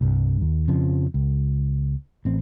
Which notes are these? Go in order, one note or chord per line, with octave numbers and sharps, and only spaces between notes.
C2 G2
D#2
F2 C#3 F3
C#2
A1 C4